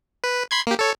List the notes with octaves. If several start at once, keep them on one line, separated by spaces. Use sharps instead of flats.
B4
B5 C6 G#6
A#3 G4
A4 C#5